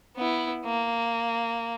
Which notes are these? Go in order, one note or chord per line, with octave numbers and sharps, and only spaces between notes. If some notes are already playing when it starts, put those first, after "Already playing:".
B3 E4
A#3